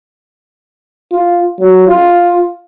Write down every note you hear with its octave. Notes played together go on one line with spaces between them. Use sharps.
F4
F#3
F4